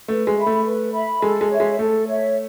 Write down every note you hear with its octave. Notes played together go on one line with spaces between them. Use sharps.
A3 B4
G#3
E5 B5
A3
B4
E5 B5
G#3 A4
G#3
C#5 E5
G#3
A3 A4
C#5 E5